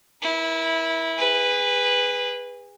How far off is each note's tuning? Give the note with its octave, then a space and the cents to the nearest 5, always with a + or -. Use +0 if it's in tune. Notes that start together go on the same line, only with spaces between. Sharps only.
E4 -15 A#4 +35
G#4 -30 B4 +0